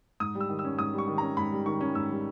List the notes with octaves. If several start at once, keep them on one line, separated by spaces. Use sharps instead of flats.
G#2 D#6
G3
E6
D#3
E6
C#4
G#2 D#6
G3 C#6
D#3
C#4 A#5
G#2 B5
G3
D#3 C#6
C#4
G#2 E6
G3